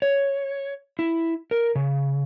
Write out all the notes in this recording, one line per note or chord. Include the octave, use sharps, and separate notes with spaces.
C#5
E4
A#4
C#3